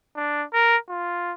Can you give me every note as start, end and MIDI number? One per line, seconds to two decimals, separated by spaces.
0.16 0.44 62
0.54 0.77 70
0.89 1.33 65